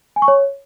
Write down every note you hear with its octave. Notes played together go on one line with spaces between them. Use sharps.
G#5
C#6
C#5